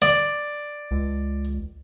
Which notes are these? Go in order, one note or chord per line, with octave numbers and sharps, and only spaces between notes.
D5
C#2